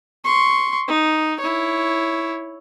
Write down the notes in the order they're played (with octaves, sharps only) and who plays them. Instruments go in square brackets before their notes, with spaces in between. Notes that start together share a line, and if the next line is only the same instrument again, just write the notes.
[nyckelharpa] C6 C#6
D#4
E4 C#5